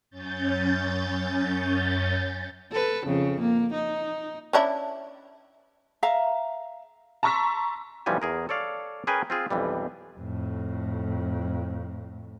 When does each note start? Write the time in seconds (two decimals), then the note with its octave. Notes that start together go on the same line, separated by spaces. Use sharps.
0.10 F#2 C#4 G6 A6
2.71 A4 B4
3.06 F2 C#3
3.41 A#3
3.73 D#4
4.53 C#4 D4 E4
6.03 E5 F5 A#5
7.23 A5 A#5 C6 C#6 E6 B6
8.06 B1 E3 F3 G3 C#4 G#5
8.22 E2 G#4 A#4
8.49 A4 C#5 D5 F5
9.07 C#4 G#4 A#4 B4 G5 G#5
9.30 C4 F4 G#4
9.50 B1 F2 E3 G3
10.19 F2 A2